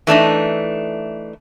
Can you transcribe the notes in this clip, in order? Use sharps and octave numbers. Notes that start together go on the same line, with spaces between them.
E3 A3 D4 D#4